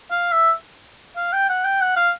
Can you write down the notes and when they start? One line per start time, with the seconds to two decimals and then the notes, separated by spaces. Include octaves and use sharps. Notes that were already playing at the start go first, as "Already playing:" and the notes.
0.11 F5
0.32 E5
1.17 F5
1.33 G5
1.49 F#5
1.64 G5
1.81 F#5
1.96 F5